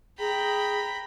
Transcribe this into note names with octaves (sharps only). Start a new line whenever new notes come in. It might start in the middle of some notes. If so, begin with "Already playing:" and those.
G#4 G5 A#5 B5